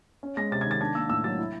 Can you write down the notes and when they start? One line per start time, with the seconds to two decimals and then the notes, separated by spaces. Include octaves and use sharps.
0.23 C#4
0.37 G#3 A#6
0.51 C3 A6
0.61 G#6
0.66 D#3 A6
0.81 D4 G#6
0.95 A#3 E6
1.10 A2 E6
1.24 F#3 A6
1.39 E4